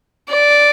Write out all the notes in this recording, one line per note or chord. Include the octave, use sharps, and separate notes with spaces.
D5